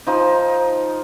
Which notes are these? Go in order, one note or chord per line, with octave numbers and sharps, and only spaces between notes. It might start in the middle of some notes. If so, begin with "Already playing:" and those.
F3 D#4